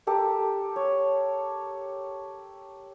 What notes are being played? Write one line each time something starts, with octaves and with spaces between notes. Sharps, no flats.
G4 A4 A#4
C#5